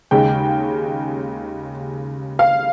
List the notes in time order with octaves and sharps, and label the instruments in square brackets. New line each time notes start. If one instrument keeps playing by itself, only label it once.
[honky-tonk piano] D#2 C#3 G#3 G5
F5